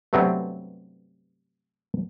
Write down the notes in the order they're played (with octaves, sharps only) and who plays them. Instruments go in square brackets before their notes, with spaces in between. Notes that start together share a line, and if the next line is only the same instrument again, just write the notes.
[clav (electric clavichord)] G2 C3 F#3 A3 B3 C4